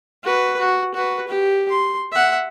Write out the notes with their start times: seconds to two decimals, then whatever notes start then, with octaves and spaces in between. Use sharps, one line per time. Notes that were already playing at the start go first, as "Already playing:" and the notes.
0.24 F#4 B4
0.59 F#4
0.94 F#4 B4
1.28 G4
1.70 C6
2.12 E5 F#5